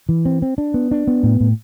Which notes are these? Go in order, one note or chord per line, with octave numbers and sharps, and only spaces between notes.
E3
C4
C4
D4
B3
D4
B3
A2
A2